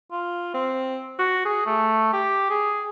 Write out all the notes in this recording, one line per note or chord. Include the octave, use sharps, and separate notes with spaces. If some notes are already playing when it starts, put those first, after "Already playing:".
F4
C4
F#4
G#4
A3
G4
G#4